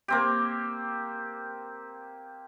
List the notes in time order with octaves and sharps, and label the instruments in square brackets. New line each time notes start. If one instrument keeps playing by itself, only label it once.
[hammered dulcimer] A#3 C4 G4